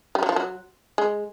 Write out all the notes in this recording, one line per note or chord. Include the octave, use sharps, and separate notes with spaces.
G3
F#3
F3
F#3
G#3